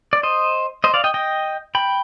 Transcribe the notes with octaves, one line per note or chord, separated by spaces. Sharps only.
D5
C5 D#5
C5 D#5
D5 F5
D#5 G5
D#5 G5
G5 B5